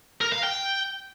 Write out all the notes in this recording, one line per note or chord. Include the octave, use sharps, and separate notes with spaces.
A#4
F5
G5